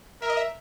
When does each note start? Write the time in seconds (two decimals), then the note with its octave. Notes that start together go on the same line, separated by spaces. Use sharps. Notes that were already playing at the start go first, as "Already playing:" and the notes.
0.22 A#4 E5
0.30 D#5
0.37 E5